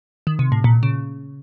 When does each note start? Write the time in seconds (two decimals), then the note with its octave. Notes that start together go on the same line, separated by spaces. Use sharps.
0.27 D#3
0.39 C3
0.52 A2
0.64 A#2
0.83 C#3